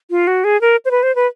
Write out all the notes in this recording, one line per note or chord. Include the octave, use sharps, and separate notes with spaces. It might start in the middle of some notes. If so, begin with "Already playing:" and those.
F4
F#4
G#4
A#4
C5
B4
C5
B4